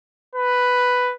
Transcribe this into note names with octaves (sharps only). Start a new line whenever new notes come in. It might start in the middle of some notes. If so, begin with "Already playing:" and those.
B4